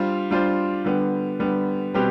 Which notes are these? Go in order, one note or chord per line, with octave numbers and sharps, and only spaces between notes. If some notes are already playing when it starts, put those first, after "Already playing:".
Already playing: G3 D4 F4 C5
G3 D4 F4 C5
D3 G3 B3
D3 G3 B3
B2 G3 C4 G4 B4